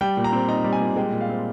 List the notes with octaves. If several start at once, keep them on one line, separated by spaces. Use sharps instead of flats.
G3 G5
A#2
A#5
C4
D#4 A#5
G3
G#5
A#2
G#3 G5
A#2
F5
C4